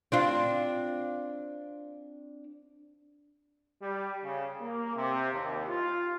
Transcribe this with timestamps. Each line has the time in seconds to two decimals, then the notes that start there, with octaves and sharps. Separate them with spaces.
0.12 C4 D4 F4
3.81 G3
4.23 C#3
4.59 A#3
4.95 C3
5.33 D#2
5.68 F4